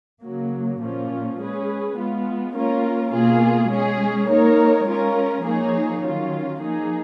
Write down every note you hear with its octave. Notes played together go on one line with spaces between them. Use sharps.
C#3 F#3 A#3
A#2 F3 A#3 C#4 F4
G#3 C#4 G#4 B4
G#3 B3 F4
A#3 C#4 F4 A#4
B2 A#3 F4 G#4
G#3 C#4 G#4
A#3 D#4 A#4 C#5
G#3 C#4 F4 A#4
F3 A#3 D#4 G#4 C#5
D#3 F#3 C#4 F4
F3 A#3 D#4 G#4